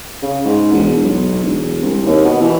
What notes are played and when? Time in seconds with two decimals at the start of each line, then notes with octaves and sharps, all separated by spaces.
0.22 C#3
0.45 G#2
0.72 E1
1.03 B1
1.44 E1
1.82 C2
2.05 D#2
2.24 B2
2.41 E3